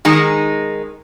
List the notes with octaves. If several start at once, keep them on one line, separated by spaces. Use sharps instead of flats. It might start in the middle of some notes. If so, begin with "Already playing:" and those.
D#3 G#3 D#4